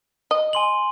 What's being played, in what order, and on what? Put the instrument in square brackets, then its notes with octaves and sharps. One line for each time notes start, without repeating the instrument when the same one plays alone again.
[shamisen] D#5
[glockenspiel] G#5 C6 F#7